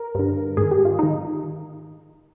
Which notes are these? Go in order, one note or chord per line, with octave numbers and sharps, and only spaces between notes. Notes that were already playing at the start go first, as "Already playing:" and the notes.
Already playing: A#4
G2 D3
G#2 D#3 G#4
G4
F4
D#3 D#4